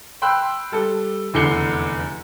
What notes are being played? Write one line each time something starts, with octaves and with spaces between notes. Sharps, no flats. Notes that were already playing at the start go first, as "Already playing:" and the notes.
G5 B5 C6 E6 F#6
G3 A4
F1 E2 D3 C7 C#7 G7